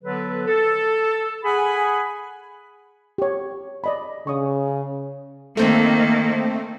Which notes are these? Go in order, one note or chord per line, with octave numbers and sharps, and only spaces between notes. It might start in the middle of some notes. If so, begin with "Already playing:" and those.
D3 F#3 B3 A4 B4
A4
G#4 F#5 G#5 B5
G4 C#5
D5 D#5 B5
C#3 C#6 D#6
D#3 A3 A#3 C4